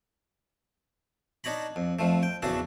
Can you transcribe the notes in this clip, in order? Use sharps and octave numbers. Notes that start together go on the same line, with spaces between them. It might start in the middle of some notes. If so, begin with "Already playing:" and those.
D4 D#4 C#5 A#5 B5
F2
F2 F3 A3
G5
E2 C#3 D4 F#4 A4